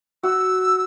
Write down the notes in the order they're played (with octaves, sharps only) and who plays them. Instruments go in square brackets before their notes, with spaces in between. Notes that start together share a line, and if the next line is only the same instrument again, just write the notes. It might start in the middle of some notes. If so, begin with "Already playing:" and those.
[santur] F#4 [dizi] E6